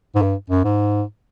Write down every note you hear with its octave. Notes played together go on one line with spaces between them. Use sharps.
G#2
G2
F#2
G#2